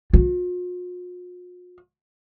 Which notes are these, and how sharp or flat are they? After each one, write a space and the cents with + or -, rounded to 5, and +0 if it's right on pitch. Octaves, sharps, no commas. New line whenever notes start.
F4 +45